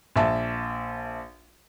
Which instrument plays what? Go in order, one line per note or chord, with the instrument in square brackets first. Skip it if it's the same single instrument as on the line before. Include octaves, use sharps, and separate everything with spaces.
[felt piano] A#1 E5 A5